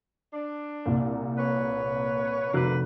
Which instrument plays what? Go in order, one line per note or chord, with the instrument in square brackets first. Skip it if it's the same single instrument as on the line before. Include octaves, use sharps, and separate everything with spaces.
[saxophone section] D4
[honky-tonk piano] C2 A#2
[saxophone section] B4 C#5
[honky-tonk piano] F1 F#4 F#6 [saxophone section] D3 A#3 B4